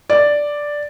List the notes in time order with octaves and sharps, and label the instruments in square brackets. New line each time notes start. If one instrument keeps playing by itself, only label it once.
[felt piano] D5